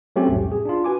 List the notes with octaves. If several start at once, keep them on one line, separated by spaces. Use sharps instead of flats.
F#3 A3 C4 C#4 G4
C2 F2 A2
G#4
D4 F4
F#4 B4 G#5 D6